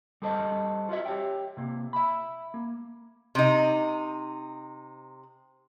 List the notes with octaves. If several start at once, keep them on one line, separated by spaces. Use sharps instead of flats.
G3 G#4 A4 C5 D#5
F4 F#4 A4 D#5 E5
G4 C#5 E5 G5
C3 A#3
E5 B5
A#3
C3 D#4